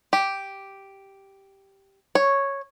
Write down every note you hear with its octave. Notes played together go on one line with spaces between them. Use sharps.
G4
C#5